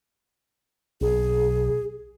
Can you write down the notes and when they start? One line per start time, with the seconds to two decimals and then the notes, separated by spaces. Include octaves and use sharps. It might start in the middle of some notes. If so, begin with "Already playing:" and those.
1.01 B1 G#4